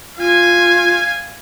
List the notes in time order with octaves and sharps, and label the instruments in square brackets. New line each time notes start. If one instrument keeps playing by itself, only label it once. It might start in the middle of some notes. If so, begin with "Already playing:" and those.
[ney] F4 [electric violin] F5 G#5